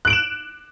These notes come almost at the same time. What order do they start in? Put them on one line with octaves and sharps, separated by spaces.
F#6 D7 F#7 E7